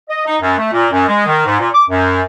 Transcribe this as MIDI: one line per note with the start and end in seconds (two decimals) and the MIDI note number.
0.09 0.24 75
0.26 0.36 63
0.41 0.54 42
0.58 0.68 57
0.72 0.86 46
0.91 1.06 42
1.07 1.23 56
1.26 1.42 51
1.45 1.58 44
1.59 1.68 46
1.73 1.83 86
1.89 2.22 42